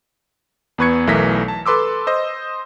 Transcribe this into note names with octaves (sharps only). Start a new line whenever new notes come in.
E2 B3 B4 C#6 G#6 C#7
B1 E3 A3 A#4 A#6 B6
A5
A4 B4 C6 D6 E6
C5 D#5